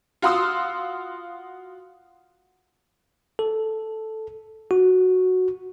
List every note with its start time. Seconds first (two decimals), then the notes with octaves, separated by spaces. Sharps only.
0.22 F4 F#4 F5 C6 D#6 E6
3.39 A4
4.71 F#4